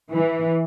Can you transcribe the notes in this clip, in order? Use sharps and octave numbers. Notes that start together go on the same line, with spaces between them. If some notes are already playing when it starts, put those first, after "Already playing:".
E3